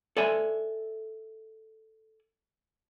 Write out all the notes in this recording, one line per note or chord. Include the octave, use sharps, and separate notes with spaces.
A4 D5 E5 G#5